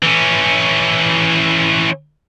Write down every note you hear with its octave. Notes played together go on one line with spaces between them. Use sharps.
E3 C#4